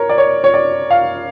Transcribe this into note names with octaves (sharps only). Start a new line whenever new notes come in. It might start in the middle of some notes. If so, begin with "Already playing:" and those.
Already playing: A#4 C#5
D5
C#5
C#5
D5
F5